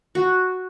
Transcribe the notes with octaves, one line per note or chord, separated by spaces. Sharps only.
F#4